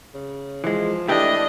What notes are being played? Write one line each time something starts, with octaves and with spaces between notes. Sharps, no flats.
C#3
E3 F3 G#3
E3 A3 D4 G4 D#5